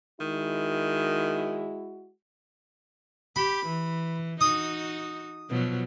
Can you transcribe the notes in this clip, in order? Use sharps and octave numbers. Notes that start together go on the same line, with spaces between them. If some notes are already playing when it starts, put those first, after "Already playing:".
D#3 G#3 E4 F#4
G4 B5
E3
D#4 F#4 D#6
B2 F3 F#3